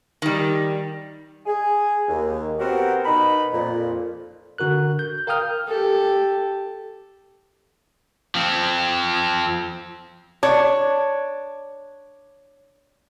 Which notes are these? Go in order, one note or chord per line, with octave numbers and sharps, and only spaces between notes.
D#3 G3
G#4
D#2
B3 C4 F#4 G4 A#4 C5
B2 D#4 A#4 B5
F2 A#2
D3 F#4 A#4 F#6
G6
A#4 F5 G5 D#6 F6 G6
G4 A4
F3 C4
D4 C#5